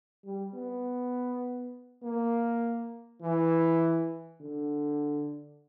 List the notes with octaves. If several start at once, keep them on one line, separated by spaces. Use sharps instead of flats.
G3
B3
A#3
E3
D3